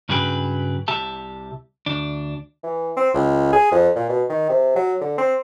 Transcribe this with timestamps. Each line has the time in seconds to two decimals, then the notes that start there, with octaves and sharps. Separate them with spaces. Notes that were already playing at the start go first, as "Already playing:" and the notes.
0.09 G2 C#3 F#3 G#4 B4 G5
0.88 C2 G4 E5 A5
1.86 D2 D4
2.63 E3
2.97 C4
3.14 C#2
3.53 G#4
3.71 F2
3.96 A#2
4.09 B2
4.29 D#3
4.49 C3
4.76 F#3
5.01 D3
5.18 C4